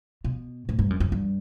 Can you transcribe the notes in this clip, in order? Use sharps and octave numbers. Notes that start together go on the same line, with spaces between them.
B2
A2
G2
F#2
F#2
G2